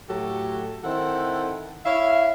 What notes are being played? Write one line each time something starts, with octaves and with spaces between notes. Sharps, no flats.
A2 F#3 F#4 G4 A4
D#3 C4 E4 A4 F#5
E4 C#5 E5 F5